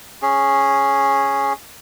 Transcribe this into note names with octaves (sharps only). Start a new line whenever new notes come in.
C#4 G#4